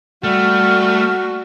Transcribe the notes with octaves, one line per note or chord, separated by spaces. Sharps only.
G3 A3 F#4 F6